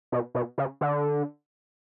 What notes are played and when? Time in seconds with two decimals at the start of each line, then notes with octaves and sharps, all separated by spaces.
0.12 B2
0.35 B2
0.58 C#3
0.81 D3